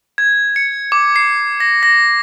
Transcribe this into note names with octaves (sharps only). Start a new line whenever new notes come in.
G#6
C#7
D6
C7
A#6
A#6